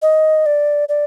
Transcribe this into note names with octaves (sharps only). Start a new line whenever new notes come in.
D#5
D5
D5